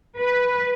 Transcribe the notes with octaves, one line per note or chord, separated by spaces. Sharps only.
B4